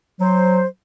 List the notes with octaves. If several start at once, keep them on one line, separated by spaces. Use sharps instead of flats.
F#3 C5